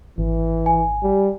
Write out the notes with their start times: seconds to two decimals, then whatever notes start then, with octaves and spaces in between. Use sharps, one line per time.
0.18 G#1 E3
0.66 G#5
1.03 G3